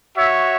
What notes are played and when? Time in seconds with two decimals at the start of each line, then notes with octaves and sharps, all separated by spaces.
0.15 F#4 C#5 E5